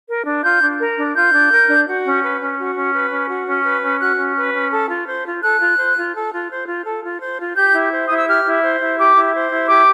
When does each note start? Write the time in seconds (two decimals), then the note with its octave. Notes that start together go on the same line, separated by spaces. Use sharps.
0.08 A#4
0.26 D4
0.43 F4 G6
0.62 D4
0.79 A#4
0.97 D4
1.15 F4 G6
1.33 D4
1.51 A#4
1.68 D4
1.87 F#4
2.04 C#4
2.22 B4
2.40 C#4
2.57 F#4
2.75 C#4
2.93 B4
3.10 C#4
3.28 F#4
3.46 C#4
3.63 B4
3.82 C#4
3.99 F#4 F#6
4.17 C#4
4.36 B4
4.53 C#4
4.70 A4
4.88 F4
5.06 C5
5.25 F4
5.41 A4 F#6
5.59 F4
5.77 C5
5.96 F4
6.13 A4
6.30 F4
6.49 C5
6.67 F4
6.85 A4
7.02 F4
7.20 C5
7.38 F4
7.55 G4 G6
7.73 E4
7.91 C5
8.06 E4 D#6
8.16 E6
8.26 G4 F6
8.45 E4
8.63 C5
8.79 E4
8.97 G4 D6
9.16 E4
9.32 C5
9.51 E4
9.68 G4 D6